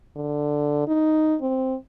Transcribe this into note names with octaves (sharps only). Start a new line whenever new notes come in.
D3
D#4
C4